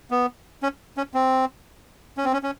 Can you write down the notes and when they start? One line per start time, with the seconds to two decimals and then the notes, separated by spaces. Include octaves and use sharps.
0.11 B3
0.63 C#4
0.97 C#4
1.14 C4
2.17 C#4
2.25 C4
2.33 C#4
2.43 C#4